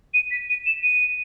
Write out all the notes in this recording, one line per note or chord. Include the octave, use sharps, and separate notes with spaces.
D#7
B6
D#7
E7
D#7